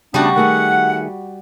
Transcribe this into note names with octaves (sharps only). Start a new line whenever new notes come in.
C#3 G3 A3 B3 D4 F#4
D#3 A3 G#4 F#5